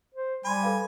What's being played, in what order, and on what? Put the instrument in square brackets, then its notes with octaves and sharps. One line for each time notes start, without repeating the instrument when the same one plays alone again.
[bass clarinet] C5
[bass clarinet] G3 [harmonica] G#5 [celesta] B5 C6
[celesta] A4 B4 F5